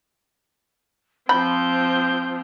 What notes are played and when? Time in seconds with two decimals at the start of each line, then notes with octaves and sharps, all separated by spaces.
1.29 F3 C4 B5 G6